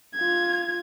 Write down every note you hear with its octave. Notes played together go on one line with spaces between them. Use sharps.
F4 G#6